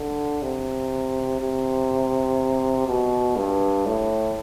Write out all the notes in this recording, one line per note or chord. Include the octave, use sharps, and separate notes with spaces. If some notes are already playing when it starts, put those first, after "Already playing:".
Already playing: D3
C3
C3
B2
G2
A2